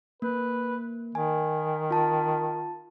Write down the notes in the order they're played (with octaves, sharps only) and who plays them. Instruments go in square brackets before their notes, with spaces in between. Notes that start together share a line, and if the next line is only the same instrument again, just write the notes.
[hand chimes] A#3 [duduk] B4
[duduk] D#3 [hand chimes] G#5
[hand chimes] F4 A5